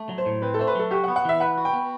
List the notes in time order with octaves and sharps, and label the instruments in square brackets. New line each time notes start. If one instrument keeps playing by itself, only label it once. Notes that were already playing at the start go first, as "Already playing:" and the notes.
Already playing: [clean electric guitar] A3
F#3
[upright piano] C5
[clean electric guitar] A2
[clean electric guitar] C4 [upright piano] B4
[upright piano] A4
[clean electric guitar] A3 [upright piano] C5
[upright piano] B4
[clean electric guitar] F#3 [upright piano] A4
[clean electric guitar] F#4 [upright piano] G4
[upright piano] F#5
[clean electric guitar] B3
[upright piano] F#5
[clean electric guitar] E3 [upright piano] E5
[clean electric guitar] B4 [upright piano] F#5
[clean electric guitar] F#4
[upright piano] G5
[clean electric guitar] B3